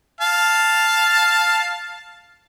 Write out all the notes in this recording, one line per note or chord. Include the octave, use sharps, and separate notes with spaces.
F5 A5